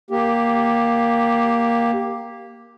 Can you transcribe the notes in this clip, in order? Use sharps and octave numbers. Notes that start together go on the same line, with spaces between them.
A#3 G4